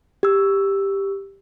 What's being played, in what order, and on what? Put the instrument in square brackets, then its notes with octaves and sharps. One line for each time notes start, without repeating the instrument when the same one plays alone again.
[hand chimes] G4 E6